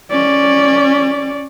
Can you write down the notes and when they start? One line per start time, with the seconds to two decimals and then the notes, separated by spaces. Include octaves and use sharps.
0.11 C#4 D5